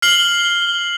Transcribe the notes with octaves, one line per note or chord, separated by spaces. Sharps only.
F6 C7 F#7 G7